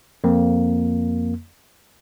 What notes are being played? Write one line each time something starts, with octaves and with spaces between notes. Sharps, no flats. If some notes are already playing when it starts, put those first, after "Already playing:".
F2 A#3